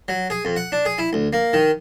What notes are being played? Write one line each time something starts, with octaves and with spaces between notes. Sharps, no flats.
F#3
G#4
F2
F#5
D4
G#4
E4
D2
A#3
D#3